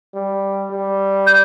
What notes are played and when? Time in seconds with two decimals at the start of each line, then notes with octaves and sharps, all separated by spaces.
0.15 G3
0.71 G3
1.27 G6